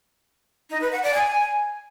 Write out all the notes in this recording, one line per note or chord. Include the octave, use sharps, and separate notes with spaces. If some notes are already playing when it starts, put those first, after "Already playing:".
D#4
B4
F#5
D5
G#5